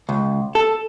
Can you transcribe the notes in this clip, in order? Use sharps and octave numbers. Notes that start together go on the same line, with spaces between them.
C#2
A4